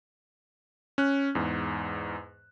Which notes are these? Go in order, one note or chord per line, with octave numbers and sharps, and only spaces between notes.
C#4 F#6
E2 G#2